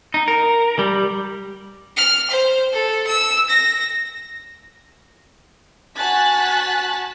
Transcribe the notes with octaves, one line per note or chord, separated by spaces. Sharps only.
D#4
A#4
G3
F6
C5
A4
E6
A#6
F#4 G#5 A5 F#6 A6 B6